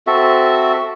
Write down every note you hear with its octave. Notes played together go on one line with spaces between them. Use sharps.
C4 F#4 A4 E5